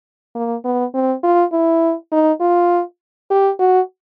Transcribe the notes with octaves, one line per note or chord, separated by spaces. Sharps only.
A#3
B3
C4
F4
E4
D#4
F4
G4
F#4